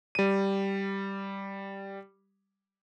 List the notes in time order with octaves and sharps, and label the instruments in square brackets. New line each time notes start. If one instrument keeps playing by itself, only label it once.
[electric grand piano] G3 D#7